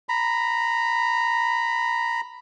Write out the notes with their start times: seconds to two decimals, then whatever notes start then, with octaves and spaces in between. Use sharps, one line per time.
0.09 A#5 B5